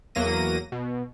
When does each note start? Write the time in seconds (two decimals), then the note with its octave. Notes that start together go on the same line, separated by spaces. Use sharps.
0.15 E2 F#3 A#3 A#6 D#7
0.72 B2